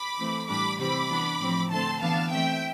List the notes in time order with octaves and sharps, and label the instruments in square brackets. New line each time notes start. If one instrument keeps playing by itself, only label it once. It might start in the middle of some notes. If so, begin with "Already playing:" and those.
Already playing: [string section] B5 D6
E3 A3 C4
A2 E3 G3 D4 B5 D6
C3 E3 G3 C4 B5 D6
E3 B3 D4
A2 F3 C4
D3 A3 C4 A5 C6
E3 B3 D4 F5 A5
E3 A3 C4 E5 G5